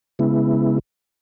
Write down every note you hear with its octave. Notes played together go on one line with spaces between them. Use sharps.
C#3 G#3 B3 E4